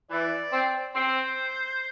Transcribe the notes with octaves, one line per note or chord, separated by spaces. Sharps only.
E3 D5
C4
C4 C5